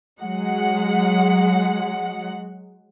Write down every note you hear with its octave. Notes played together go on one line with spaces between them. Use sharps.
F#3 G#3 F#5